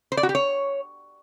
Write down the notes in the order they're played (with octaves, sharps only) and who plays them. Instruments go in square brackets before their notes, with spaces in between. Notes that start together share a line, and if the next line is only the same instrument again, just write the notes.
[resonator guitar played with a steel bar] C5
D5
F#4
G4
C#5